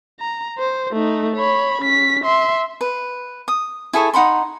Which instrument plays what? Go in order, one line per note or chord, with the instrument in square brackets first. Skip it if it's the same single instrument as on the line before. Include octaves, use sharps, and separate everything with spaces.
[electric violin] A#5
C5
A3 D#4
C#5 B5
C#4 B6
E5 C6
[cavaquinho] B4
D#6
E4 G#4 A4 C#5
D#4 F#5 B5 C6